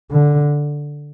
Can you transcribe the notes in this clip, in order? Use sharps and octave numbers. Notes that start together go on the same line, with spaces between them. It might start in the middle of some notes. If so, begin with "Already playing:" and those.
D3